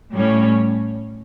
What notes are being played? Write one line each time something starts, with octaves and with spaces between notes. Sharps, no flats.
A2 G3 C#4